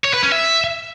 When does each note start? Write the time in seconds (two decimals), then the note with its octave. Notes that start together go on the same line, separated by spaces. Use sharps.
0.04 C#5
0.13 B4
0.23 C#4
0.32 E5